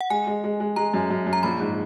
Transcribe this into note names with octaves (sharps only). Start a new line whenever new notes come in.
F#5
G#3 G#5
G#3
G#3
G#3
G#3 A#5
F#2
F#2
F#2
A#5
A#1 B5
G#2